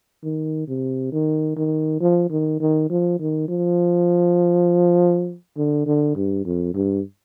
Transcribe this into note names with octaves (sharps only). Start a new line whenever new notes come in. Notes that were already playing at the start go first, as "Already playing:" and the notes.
D#3
C3
D#3
D#3
F3
D#3
D#3
F3
D#3
F3
D3
D3
G2
F2
G2